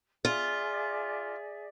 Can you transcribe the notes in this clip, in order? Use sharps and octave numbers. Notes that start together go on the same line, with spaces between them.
F4 G#4 D5 E5